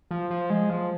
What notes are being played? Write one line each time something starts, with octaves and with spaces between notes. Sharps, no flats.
F3
F3
G#3
F3